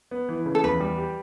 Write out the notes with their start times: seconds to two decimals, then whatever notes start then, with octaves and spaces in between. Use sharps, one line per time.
0.11 B3
0.29 E3
0.46 C#3
0.55 A4
0.63 E2 B4
0.80 G3
0.98 G4